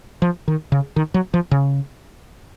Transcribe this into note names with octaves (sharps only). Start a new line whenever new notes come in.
F3
D#3
C#3
D#3
F#3
F3
C#3